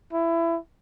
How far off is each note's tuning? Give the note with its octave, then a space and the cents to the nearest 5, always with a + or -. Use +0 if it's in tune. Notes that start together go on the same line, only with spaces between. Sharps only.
E4 +20